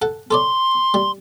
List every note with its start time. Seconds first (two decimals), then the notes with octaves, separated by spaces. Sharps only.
0.02 A4 F#5
0.31 A4 C#5 D5 C6
0.94 G3